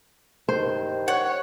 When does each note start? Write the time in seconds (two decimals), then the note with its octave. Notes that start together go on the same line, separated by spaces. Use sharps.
0.49 G2 D#3 C5
1.08 C#5 F#5